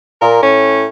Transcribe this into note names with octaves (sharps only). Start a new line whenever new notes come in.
A#2 A#4
A2 C#4